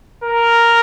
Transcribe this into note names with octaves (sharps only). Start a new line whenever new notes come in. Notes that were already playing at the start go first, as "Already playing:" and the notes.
A#4